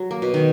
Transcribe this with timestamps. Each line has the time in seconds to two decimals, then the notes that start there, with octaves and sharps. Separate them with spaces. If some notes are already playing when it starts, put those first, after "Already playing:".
Already playing: F#3
0.11 A#3
0.22 B2
0.34 D#3